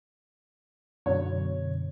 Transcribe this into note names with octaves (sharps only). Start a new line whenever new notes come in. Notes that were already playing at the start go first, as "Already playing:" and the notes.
F#2 B2 D3 C#5